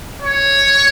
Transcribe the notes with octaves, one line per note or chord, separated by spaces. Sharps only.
C#5